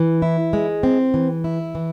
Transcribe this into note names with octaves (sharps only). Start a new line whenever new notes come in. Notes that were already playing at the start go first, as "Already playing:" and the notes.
Already playing: E3
E4
G#3
C4
E3
E4
E3